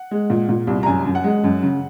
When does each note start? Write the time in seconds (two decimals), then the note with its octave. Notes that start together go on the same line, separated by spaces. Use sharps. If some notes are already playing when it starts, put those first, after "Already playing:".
Already playing: F#5
0.11 G#3
0.30 A#2
0.49 A#2
0.67 C2
0.83 A#5
0.86 F#2 G#5
1.06 F#2
1.15 F#5
1.24 G#3
1.44 F#2
1.63 C#3